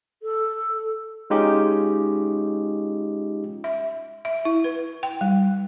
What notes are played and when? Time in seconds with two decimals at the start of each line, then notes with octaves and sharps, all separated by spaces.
0.23 A4
1.30 G#3 C#4 D#4 F4 G4
3.64 E5
4.25 E5
4.45 E4
4.64 B4
5.03 G5
5.21 G3